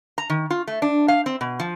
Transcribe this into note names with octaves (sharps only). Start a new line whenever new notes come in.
A#5
D#3
F4
A3
D4
F5
C4
B2
F3